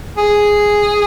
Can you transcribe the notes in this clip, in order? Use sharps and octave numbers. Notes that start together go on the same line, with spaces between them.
G#4